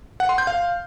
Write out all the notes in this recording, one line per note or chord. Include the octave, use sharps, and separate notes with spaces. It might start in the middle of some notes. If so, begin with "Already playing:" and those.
F#5
C6
G6
F5